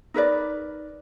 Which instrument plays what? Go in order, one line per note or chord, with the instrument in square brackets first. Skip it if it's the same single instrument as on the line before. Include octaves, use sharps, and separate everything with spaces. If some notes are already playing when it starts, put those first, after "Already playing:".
[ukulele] D#4 A#4 B4 D5